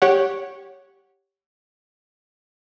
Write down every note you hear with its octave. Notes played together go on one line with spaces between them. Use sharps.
G4 C#5 F#5